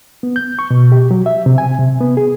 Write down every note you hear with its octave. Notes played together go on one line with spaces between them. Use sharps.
B3
G6
C#6
B2
G4
F#3
E5
C3
G#5
C3
B3
G#4